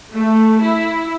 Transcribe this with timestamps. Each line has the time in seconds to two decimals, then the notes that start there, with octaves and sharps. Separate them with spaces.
0.12 A3
0.60 E4